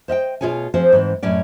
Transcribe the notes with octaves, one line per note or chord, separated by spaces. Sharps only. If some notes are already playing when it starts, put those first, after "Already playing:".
C5 D#5 F5 G5
B2 F3 F4 G#4 C#5 G#5
F3 C4 G#4 C5
G#2 E3 C4
F#2 A2 C#4 D5